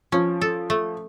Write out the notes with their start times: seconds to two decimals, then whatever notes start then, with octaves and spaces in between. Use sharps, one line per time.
0.12 F3 C#4
0.41 A4
0.70 A3